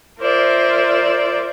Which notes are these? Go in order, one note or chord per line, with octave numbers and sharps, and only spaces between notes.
F4 A#4 C5 D5 E5